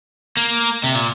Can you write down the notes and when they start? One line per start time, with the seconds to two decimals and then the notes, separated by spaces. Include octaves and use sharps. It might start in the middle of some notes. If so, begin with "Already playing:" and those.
0.37 A#3
0.84 C3
0.95 A#2